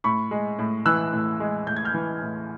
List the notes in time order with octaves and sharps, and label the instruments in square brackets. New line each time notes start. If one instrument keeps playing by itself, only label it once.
[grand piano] A2 B5 C#6
G#3
A2
E3 E6 F#6
A2
G#3
A2 G6
G#6
F6 G6
E3
A2